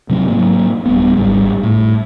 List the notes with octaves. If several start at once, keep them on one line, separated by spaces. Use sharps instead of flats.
C3 F#3 C4
G#2 F#3 A#3
D1 G3 B3
G#1 D#2 G#2 G3
A2